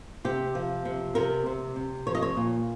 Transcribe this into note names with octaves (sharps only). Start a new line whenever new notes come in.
C3 G4
F3
C3
C3 A#4
C3
C3
F3 C#5
D#5
C#5
A#2